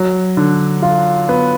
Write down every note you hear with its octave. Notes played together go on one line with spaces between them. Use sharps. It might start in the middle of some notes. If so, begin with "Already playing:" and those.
Already playing: F#3
D3
F4
B3